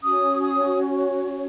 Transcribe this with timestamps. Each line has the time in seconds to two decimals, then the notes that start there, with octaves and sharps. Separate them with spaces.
0.02 C#4 F#4 C#5 D#6
0.42 D#6